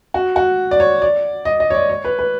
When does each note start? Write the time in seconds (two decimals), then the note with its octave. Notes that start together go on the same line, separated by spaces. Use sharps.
0.14 F#4
0.36 F#4
0.71 D5
0.80 C#5
1.02 D5
1.45 D#5
1.60 D#5
1.71 C#5
1.75 D5
1.90 C#5
2.05 B4
2.19 B4